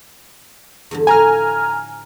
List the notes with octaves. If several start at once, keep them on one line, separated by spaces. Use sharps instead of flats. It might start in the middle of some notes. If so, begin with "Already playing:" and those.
E2 G2 D3
A2 F3 G#5 A#5 F6